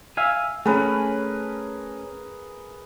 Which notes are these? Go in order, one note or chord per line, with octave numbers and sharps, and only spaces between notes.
E5 F5 G#5
A3 C#4 G#4 A#4 B4